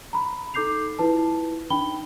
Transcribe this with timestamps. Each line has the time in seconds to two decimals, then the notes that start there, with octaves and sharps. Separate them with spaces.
0.13 A#5 B5
0.54 D#4 A4 D6 G6 C7 F7
0.99 E4 F4 B4 A5
1.70 D4 D#4 G5 B5 G7